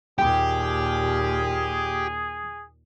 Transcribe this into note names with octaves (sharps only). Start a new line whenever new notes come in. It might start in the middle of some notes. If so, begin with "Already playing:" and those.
D#2 A#2 G4 G#4 G5